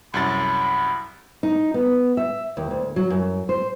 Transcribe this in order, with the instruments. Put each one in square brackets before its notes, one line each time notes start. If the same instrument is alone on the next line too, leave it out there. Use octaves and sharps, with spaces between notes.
[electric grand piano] C2 F#2 A6 [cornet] B5
[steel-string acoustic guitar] D#4
B3
E5
D#2
D2
F#3
F#2
C5